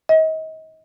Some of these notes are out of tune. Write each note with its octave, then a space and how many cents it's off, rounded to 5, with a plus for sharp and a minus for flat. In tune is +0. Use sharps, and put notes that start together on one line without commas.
D#5 +35